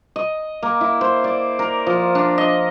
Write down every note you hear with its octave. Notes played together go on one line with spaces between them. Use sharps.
D#5
A#3
E4
C5
D5
A#4
F3
D4
D#5